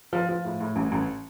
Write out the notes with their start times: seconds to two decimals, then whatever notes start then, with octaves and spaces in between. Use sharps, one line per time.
0.13 F3
0.29 F3
0.45 A2
0.60 A2
0.76 A1
0.92 A1